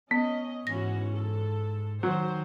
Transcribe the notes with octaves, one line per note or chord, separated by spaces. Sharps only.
B3 C#4 D#5
G#2 E3 C#4 F#4 A#6
A4
D#3 F#3 C5